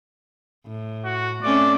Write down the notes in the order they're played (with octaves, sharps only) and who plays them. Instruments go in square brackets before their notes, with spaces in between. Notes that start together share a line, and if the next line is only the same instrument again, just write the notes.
[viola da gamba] A2
[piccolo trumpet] F#4
[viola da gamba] A3 C4 C#4 [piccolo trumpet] D5